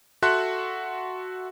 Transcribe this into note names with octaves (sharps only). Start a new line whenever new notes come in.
F#4 A4 E5 F#5 C6 F#6